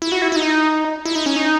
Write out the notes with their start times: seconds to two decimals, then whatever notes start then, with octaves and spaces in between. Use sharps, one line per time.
0.02 E4
0.12 F#4
0.22 E4
0.32 E4
0.36 D#4
1.05 E4
1.15 D#4
1.26 C#4
1.36 D#4